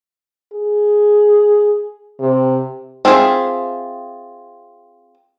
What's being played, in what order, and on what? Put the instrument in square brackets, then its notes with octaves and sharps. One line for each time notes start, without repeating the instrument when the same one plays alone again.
[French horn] G#4
C3
[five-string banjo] C4 D4 F4 G#4 E5